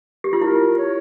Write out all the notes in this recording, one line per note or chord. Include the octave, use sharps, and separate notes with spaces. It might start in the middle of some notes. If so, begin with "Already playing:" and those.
G4
F4
E4 A#4
C#5